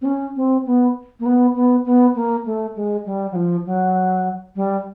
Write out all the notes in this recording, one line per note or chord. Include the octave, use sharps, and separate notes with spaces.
C4
C#4
C4
B3
A#3
B3
B3
B3
A#3
A3
G#3
G3
F#3
F3
F#3
G3